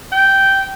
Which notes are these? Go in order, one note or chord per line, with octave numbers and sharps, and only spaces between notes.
G5